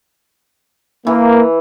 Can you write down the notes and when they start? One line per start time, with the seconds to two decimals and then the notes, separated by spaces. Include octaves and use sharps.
1.07 E3 A#3